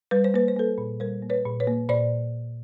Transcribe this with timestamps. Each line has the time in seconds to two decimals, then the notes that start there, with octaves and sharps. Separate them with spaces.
0.11 G3 B4
0.24 C5
0.34 A#3 B4
0.48 C5
0.56 A#3 A4 B4
0.78 A#2
1.00 G3 A#4 C5
1.22 A#3
1.30 B4 C#5
1.46 A#2
1.60 B4 C#5
1.67 A#3
1.89 A#2 C5 D5